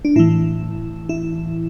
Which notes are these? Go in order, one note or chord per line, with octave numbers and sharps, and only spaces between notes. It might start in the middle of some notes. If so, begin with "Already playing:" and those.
D4
A2 E3 E4
E4